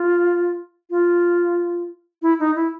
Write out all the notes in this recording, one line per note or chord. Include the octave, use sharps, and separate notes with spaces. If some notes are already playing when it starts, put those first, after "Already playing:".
Already playing: F4
F4
E4
D#4
E4